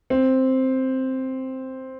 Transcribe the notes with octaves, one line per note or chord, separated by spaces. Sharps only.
C4